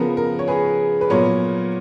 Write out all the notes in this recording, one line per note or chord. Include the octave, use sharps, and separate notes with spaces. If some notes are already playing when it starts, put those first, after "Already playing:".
Already playing: C#3 F3 B3 A#4
A#4
C#5
G#4 B4
B4
A#2 F#3 B3 A#4 C#5